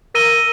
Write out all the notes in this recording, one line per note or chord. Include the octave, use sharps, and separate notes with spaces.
A#4 E6 A#6 D#7 G7